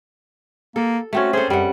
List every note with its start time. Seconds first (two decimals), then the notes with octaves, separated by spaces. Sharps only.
0.76 A#3 A4
1.13 A3 C4 C#4 F#4
1.33 G#4 A4 C5
1.50 F#2 G3 F#5